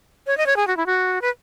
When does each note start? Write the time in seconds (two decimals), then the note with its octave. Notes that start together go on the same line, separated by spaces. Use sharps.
0.27 C#5
0.37 D#5
0.46 C#5
0.57 G#4
0.67 F#4
0.77 E4
0.86 F#4
1.22 B4